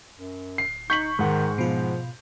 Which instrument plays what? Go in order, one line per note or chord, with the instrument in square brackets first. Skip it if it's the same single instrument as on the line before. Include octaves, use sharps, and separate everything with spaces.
[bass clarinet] F#2
[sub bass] D1 [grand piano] C7
[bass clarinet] D#4 [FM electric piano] C#6 [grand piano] G6 B6 F#7
[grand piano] G#2 F#5 [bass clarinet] D#3
[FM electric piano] B2 F4 [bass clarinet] F3